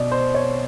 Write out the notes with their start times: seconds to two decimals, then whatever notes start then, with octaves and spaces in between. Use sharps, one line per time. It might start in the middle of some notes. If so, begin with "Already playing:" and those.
Already playing: B2 D5 D#5
0.12 C5
0.35 C#5